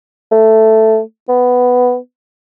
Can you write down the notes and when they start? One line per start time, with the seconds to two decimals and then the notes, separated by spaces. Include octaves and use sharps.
0.32 A3
1.29 B3